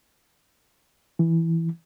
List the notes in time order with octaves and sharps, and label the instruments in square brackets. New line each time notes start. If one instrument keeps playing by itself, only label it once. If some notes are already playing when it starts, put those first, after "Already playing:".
[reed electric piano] E3